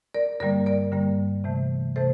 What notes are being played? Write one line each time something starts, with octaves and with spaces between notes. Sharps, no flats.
A#4 D5
G2 D3 G3 A#3 A#4 D5
A#4 D5
G2 D3 G3 A#3
C3 E3 A3
C3 E3 A3 A4 C5